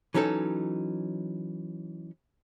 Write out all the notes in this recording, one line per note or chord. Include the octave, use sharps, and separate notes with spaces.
E3 F#3 C#4 D#4 A4